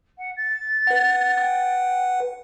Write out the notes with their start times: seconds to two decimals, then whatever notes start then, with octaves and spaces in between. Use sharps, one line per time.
0.18 F#5
0.37 A6
0.87 B4 F#5
1.39 G5